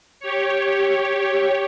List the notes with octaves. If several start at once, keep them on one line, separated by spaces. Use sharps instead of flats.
G4 C#5